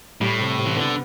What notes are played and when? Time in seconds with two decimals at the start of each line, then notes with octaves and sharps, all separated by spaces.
0.21 A2 G3
0.40 C3
0.58 C3
0.66 E3
0.76 D3 B3